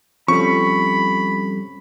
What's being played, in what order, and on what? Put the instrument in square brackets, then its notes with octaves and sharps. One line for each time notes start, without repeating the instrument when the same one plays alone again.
[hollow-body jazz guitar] F3 G3 [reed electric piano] C4 C#4 A4 [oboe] B5 [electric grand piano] C#6